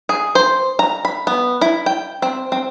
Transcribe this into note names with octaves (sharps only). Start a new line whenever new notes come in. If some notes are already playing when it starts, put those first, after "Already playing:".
G#4
C5
A#5
B5
B3
E4
G5
C4
C4